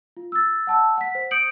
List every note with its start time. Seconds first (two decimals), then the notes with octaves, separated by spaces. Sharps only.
0.17 F4
0.32 E6 A6
0.67 F#5 A5 E6
0.97 F#5 B6
1.15 C5
1.31 D#6 G6 C#7 D7 F#7